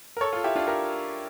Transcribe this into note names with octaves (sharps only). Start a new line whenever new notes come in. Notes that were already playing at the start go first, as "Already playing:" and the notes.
A#4
A4 C#5
F4 A4
E4 G4
D4 F4
G4 A#4